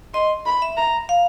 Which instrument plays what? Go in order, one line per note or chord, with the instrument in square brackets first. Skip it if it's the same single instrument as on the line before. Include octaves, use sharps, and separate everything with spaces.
[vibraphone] D#5 [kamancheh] C6
[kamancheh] B5
[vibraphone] E5
[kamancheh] A#5
[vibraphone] F5